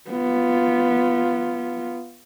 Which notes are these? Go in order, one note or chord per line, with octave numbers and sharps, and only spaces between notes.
B3 F4